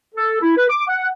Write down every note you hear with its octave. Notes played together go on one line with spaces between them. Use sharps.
A4
E4
B4
D6
F#5